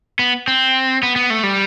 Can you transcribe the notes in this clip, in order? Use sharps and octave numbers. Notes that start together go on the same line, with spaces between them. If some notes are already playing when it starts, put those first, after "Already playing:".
B3
C4
B3
B3
A3
G3